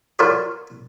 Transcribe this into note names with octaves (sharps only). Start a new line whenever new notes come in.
F4 F#4 A#4 B4 C#5 D5